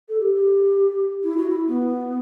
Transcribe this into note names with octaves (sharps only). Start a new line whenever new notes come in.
A4
G4
G4
E4
F#4
E4
B3